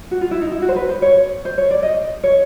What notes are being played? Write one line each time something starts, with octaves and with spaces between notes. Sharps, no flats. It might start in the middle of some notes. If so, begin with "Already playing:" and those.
F#4
F4
E4
D#4
E4
F#4
C5
B4
C5
C#5
C5
C#5
D5
D#5
C#5